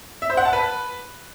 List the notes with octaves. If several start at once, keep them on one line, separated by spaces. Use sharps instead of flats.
E5
C5
F#5
A5
B4